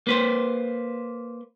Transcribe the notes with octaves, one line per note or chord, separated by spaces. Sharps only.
A#3 B4 C5